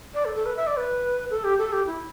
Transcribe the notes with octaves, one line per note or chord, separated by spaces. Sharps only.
D5
A4
A4
B4
E5
D5
B4
A4
G4
A4
G4
E4